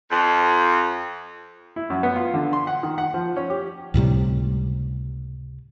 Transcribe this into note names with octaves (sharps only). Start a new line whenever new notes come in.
F2
E4
F#2
B3
F4
D3
C6
F#5
D#3
F#5
F3
C#4
G4
C#2 A2 C3 G3